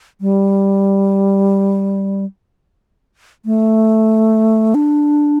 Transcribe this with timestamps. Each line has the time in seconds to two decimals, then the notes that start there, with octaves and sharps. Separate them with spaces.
0.21 G3
3.46 A3
4.75 D4